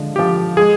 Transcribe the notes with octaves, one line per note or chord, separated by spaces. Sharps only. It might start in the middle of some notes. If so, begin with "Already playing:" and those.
Already playing: D3 F3 G#3
F3 G4
G#3 G#4